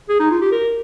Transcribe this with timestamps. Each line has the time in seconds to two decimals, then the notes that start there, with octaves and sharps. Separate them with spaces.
0.09 G#4
0.20 D#4
0.31 F4
0.42 G4
0.52 A#4